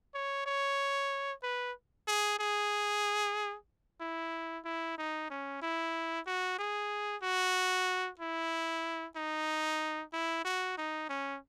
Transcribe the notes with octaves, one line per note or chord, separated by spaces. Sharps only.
C#5
C#5
B4
G#4
G#4
E4
E4
D#4
C#4
E4
F#4
G#4
F#4
E4
D#4
E4
F#4
D#4
C#4